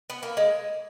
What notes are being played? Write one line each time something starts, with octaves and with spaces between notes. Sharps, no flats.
B3
A#3
G#3